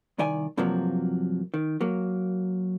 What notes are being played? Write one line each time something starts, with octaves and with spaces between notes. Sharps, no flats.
C2 D#3 D5 G#5
G2 C3 F3 F#3 A#3 F#4
D#3
F#3 A#3